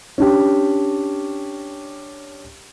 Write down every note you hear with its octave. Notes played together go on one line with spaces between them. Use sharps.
C#4 D4 G4